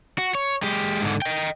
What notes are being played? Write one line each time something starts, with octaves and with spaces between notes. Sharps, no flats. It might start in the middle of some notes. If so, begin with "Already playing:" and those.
F#4
C#5
G#3 G4
G#2 D3
D#5 G5